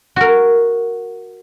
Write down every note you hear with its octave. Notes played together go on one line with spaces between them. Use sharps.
F#4 A#4